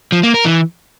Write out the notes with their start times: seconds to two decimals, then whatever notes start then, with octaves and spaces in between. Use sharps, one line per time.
0.12 F3
0.23 A#3
0.34 A#4
0.45 E3